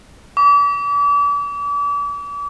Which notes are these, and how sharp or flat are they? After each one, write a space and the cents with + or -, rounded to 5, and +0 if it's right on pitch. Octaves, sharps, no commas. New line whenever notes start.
D6 -40